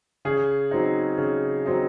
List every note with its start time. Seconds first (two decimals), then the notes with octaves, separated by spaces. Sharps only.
0.25 C#3 G#4
0.71 F#3 C4 D#4
1.18 C#3
1.66 F#3 C4 D#4